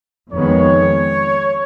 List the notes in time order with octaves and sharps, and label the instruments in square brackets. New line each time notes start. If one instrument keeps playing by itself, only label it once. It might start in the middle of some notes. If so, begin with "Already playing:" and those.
[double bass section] F2 D#3 G#3 B3 [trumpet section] C#5